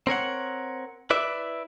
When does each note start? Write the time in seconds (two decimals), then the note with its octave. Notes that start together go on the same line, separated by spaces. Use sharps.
0.07 C4 A#4 C#5 F#5
1.10 E4 B4 D5 E5